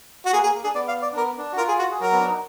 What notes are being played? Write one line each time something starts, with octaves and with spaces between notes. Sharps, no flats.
F#4
A#3 G#4
A#3 G#4
A#3
D4 G#4
B3 D5
F5
D5
D4
B3 A#4
D4
F#4
F4 A#4
G#4
F#4
G#4
F#3 F#4 A#4
B3
D4
D#4